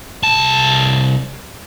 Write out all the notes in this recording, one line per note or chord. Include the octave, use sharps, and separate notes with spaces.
C2 A5